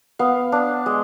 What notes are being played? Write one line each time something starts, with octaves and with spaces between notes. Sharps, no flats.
B3 F5
D4
G#3